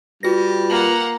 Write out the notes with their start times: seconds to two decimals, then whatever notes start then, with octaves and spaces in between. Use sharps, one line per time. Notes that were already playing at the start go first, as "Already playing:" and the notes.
0.23 G3 F4 F#4 B4 A#6
0.70 A#3 F#5 F#7